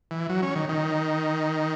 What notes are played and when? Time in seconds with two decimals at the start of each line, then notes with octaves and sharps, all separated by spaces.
0.11 E3
0.29 F#3
0.42 C#4
0.56 D#3
0.69 D#3